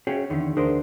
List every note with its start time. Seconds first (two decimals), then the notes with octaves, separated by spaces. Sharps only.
0.07 C#4 F#4 G#4 C#5 G5
0.30 E2 D3 D#3 C#4
0.57 D2 D4 G#4 A#4 C5